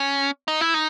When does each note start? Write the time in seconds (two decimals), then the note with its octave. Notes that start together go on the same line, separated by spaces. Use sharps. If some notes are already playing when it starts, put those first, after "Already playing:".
Already playing: C#4
0.48 D#4
0.61 E4
0.74 D#4